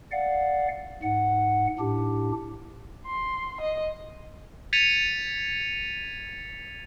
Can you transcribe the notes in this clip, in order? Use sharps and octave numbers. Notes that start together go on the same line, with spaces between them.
D5 F5 F#5
G#2 F#5
A2 D4 G4
C6
D#5
G#6 A6 B6 C#7 D#7 F7